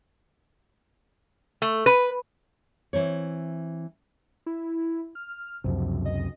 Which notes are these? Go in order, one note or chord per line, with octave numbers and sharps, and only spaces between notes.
A3
B4
E3 C4 C#5
E4
F6
C#2 F#2 C3 F3
D#5